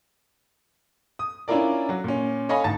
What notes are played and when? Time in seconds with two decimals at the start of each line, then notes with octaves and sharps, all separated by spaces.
1.19 D#6
1.48 C#4 D4 E4 F4 A#4 D5
1.89 F#3 F#4
2.04 A#2 C#4
2.49 A4 C#5 D#5 F5 G#5 B5
2.64 A1 D2 D#4 A5 A6